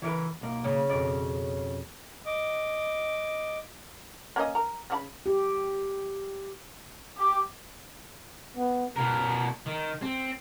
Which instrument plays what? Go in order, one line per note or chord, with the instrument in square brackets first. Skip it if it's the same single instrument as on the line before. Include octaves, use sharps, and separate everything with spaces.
[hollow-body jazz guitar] E3 A#4 B4
B1 A#3
[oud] C#3
[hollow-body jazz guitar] F2 B2 D5
[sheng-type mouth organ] D#5 D6
[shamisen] A#3 C#4 D#5
A#4
C#3 F#4 B5
[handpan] G4
[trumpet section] G4
[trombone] B3
[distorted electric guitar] B2 A#4
D#3
C4